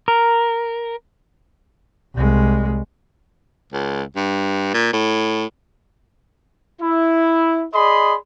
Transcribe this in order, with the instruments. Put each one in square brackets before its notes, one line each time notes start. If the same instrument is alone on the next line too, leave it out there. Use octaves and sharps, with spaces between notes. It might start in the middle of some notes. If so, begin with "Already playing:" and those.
[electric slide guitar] A#4
[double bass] C2 G#3
[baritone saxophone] C#2
G2
A#2
A2
[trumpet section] E4
G#4 D5 D#5 B5 C6